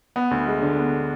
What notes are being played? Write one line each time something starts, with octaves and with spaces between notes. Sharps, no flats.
B3
D2
G#3
D3
B3